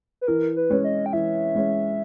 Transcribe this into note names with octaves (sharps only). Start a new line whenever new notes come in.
B4
E3 A#4
B4
G#3 C#4
D#5
G5
E3 E5
G#3 C#4